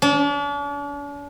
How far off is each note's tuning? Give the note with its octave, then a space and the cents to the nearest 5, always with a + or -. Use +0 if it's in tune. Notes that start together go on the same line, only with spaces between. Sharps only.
D4 -45